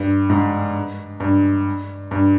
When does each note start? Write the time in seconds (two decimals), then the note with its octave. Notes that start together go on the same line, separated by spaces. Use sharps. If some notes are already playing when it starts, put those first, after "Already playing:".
Already playing: G2
0.30 G#2
1.20 G2
2.11 G2